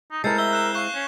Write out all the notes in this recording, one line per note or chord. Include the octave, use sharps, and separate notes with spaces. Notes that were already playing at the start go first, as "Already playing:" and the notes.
D#4
G#3 C4 E4 A4 A#4 G6 C7
E5 G6 G7
F#6 E7
F5 C#6 F#6 E7
C#4